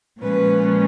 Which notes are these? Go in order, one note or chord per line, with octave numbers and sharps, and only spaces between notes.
A#2 F3 G#3 C#4 B4